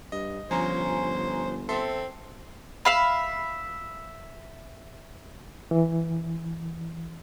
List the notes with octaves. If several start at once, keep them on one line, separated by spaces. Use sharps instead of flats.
G2 D#5
G1 F3 C#4 C5 G#5 A#5
C4 A4 E5 C6
E5 F5 B5
E3